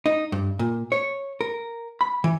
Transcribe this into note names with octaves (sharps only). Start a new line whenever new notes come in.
D#4
G2
A#2
C#5
A#4
B5
E3